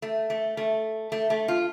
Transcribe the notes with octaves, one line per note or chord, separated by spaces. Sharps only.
A3
A3
A3
A3
A3
F4